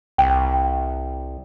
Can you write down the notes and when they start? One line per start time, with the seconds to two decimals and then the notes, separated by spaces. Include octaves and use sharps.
0.18 C2 G5